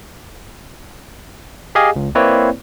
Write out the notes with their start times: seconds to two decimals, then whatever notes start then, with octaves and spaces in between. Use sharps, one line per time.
1.75 G4 G#4 D#5 F5 G#5
1.96 C#2
2.15 A#3 C4 E4 B4 C#5 D5